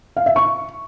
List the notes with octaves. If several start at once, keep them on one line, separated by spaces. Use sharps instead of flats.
F5
E5
C#6